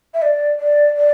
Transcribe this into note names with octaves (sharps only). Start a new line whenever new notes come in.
E5
D5
D5
D5